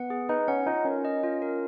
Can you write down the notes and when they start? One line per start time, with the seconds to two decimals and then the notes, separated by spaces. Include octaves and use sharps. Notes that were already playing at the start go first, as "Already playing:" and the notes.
Already playing: B3 F#5
0.10 G#4
0.29 D#4 B4
0.48 C#4 F#5
0.67 D#4 F4
0.85 C#4 A#4
1.05 D#5
1.24 F4
1.42 A#4